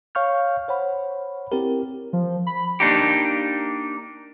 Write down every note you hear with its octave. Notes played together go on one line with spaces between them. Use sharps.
C#5 F5 C#6 F6 G6
C5 C#5 F#5 B5
C4 E4 G4 A#4
F3
B5
A#3 D4 D#4 G4